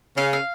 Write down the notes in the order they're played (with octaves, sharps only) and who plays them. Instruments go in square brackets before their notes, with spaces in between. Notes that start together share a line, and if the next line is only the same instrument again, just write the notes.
[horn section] C#3 C#4 [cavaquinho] F5
[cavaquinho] F5